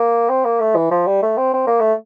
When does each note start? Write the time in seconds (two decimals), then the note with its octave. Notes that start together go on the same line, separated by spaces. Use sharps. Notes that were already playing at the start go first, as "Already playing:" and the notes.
Already playing: A#3
0.29 C4
0.45 A#3
0.60 A3
0.76 E3
0.91 F3
1.07 G3
1.22 A3
1.38 C4
1.54 C4
1.67 A#3
1.80 A3